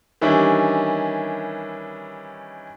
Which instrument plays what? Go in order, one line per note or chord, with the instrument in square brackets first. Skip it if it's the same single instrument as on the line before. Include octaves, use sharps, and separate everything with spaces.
[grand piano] D#3 E3 G3 C#4 D4